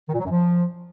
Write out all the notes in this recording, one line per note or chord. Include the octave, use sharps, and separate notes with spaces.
D#3
A#2
F#3
F#2
F3